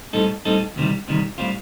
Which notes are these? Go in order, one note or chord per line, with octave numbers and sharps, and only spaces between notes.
A2 G3 C4 D#4 A4
A2 G3 C4 D#4 A4
D2 C3 D#3 G3
D2 C3 D#3 G3
A2 G3 C4 F4